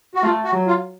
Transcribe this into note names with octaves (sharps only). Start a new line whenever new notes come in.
F#4
A3 F4
F#4
F#3
F4